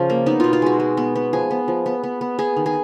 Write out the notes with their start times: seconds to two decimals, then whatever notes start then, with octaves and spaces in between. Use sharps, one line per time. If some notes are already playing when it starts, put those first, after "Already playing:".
Already playing: C#3 F3
0.10 A#3
0.26 B3 D#4
0.40 B2 F4
0.53 F4
0.62 G#3 F#4
0.80 G#3
0.97 B3
1.15 B3
1.33 F3 G#4
1.51 B3
1.68 F3
1.86 B3
2.03 B3
2.21 B3
2.39 B3 G#4
2.57 D#3
2.66 G#4